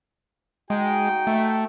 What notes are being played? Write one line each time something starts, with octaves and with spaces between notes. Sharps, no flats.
G#3 D#4 F#4 G5
A3